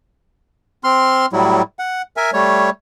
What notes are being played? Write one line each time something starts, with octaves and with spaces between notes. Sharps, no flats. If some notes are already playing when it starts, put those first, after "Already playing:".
C4 C6 F6
A2 F#3 G3 E4
F#5
A#4 E5 G#5
G3 A3 C#5